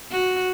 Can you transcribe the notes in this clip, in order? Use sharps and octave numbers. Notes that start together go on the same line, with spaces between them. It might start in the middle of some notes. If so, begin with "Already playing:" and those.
F#4